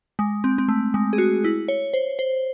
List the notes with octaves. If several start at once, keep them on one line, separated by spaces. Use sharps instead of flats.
G#3
C4
C4
A3
G#3
G#4
F#4
E4
C#5
C5
C5